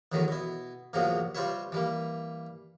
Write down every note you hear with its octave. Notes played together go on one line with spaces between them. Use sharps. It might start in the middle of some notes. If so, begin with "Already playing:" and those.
E2 A2 D#3 E3 F#3
B2 E4
E2 G#2 C3 F3 F#3 A#3
G3 C4 F4 B4 C#5 E5
E3 G3 A#3